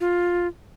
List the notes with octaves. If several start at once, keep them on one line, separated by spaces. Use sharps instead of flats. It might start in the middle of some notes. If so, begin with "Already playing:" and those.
F4